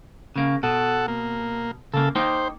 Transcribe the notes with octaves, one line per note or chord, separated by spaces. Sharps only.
C#3 A#3
B2 A4 F#5
A#3
C#3 A#3 A4
A#3 D#4 C5 G5